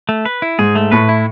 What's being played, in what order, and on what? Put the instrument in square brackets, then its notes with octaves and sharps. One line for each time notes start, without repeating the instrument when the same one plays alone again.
[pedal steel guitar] A3
B4
E4
[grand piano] G#2 [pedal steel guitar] G#4
[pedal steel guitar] A3
[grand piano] A2 [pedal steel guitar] B4
[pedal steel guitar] E4